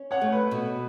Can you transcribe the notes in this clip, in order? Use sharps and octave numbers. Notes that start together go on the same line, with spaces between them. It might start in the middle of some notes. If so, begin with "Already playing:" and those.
Already playing: C#4
C#5 F#5
A3
B4
B2